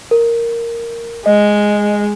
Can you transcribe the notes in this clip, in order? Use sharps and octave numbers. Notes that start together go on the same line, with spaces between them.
A#4
G#3 D#5